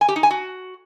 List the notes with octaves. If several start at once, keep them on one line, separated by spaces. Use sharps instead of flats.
G#5
G4
D#4
G#5
F#4